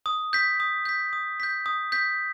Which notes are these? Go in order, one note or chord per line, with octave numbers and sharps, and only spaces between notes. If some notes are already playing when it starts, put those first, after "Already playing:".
D#6
G6 B6
D#6
G6 B6
D#6
G6 B6
D#6
G6 B6